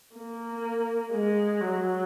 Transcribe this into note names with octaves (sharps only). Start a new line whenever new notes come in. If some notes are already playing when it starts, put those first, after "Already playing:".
A#3
G#3
F#3